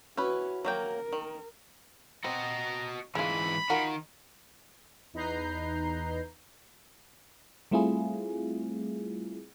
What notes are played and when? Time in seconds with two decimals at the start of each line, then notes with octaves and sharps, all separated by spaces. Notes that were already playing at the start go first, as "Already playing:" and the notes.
0.17 C#4 E4 F#4 B4
0.65 F#3 A#3 A#4 G5
1.12 D#3
2.24 C4 F#4 D#5 A#5
3.15 G#2 E3 G#3 F4 B5
3.70 D#3 F4 F#4 A#4
5.14 E2 D#4 B4 A#5 G6 C7
7.71 G3 A3 C4 E4 F4 G#4